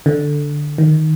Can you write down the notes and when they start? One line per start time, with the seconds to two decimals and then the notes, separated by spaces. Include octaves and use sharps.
0.06 D3
0.78 D#3